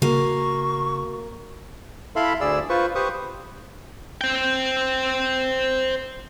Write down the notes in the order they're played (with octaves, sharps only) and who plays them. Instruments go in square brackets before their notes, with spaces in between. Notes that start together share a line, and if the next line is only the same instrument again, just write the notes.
[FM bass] C#3 [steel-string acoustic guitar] A#3 [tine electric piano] F#4 [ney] C#6
[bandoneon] E4 A4 E5 F5 B5 C6
D2 G#4 D5 E6
F4 B4 C5 C#6
G4 B4 C5 C#6 D#6
[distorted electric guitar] C5 G5